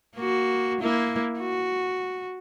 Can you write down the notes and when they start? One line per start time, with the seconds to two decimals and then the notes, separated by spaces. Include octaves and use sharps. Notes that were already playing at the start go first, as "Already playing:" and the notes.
0.16 A#3 F#4
0.80 A#3 E4
1.39 F#4